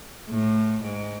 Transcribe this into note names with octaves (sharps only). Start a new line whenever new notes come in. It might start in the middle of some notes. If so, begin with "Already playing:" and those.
A2
G#2